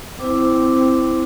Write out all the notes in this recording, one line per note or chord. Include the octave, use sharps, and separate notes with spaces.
C4 E4 D6